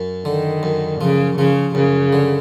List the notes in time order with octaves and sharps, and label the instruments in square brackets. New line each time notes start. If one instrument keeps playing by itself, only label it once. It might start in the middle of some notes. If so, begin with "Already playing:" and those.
Already playing: [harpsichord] F#2
[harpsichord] D3 [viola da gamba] D#3
[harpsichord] F#2
[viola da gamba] C#3 [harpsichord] F3
[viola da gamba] C#3 [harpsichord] F3
[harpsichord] F#2 [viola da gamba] C#3
[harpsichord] D3